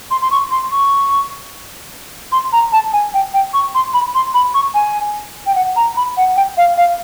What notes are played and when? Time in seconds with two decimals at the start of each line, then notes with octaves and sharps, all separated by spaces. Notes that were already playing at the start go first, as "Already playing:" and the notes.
0.11 C6
0.22 C6
0.31 C#6
0.51 C6
0.71 C#6
2.32 C6
2.53 A#5
2.72 A5
2.93 G#5
3.14 G5
3.34 G5
3.54 C#6
3.75 C6
3.94 B5
4.15 C6
4.34 B5
4.54 C#6
4.74 G#5
5.46 G5
5.55 F#5
5.76 A#5
5.97 B5
6.17 F#5
6.36 G5
6.57 F5
6.78 F5